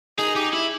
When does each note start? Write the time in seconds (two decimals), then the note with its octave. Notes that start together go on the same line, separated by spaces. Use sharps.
0.19 D#4 G#4
0.35 D#4 G4
0.53 E4